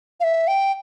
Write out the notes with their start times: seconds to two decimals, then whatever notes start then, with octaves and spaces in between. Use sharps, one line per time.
0.20 F5
0.24 E5
0.48 G5